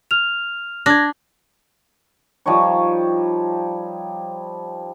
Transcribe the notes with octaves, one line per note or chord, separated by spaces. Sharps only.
F6 F7
D4 G#6 A#6
F3 G3 D#4 C#5